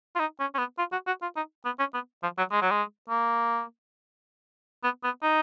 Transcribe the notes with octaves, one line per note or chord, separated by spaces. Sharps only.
F4
D#4
C#4
C#4
B3
F4
F#4
F#4
F4
D#4
B3
C#4
B3
F3
F#3
G#3
F#3
G#3
A#3
B3
B3
D#4